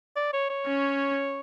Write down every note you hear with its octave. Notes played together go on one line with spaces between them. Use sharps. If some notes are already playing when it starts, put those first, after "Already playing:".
D5
C#5
C#5
C#4